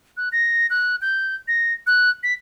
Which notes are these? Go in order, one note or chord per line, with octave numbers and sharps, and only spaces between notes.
F#6
A#6
F#6
G6
A#6
F#6
B6